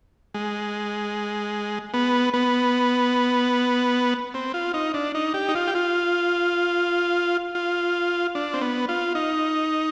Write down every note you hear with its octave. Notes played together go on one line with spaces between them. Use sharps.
G#3
B3
B3
C4
F4
D#4
D4
D#4
G4
D#4
F4
G4
F4
F4
D4
C4
B3
F4
D#4